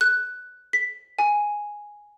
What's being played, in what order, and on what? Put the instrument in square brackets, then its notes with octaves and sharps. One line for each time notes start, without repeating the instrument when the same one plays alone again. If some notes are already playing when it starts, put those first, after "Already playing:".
[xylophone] F#6
B6
G#5